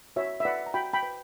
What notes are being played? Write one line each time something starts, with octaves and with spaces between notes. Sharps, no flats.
F#4 C#5 E5
E5
B4 D5 F#5
A#5
F#4 G5 B5
G5 B5
B4